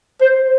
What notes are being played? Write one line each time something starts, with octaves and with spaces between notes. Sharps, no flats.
C5